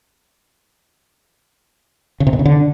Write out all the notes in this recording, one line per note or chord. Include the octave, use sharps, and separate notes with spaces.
C#3
C3
B2
C#3
D3